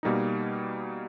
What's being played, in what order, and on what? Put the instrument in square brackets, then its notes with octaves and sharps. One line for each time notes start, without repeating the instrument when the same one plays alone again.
[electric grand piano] B2 G3 A#3 D#4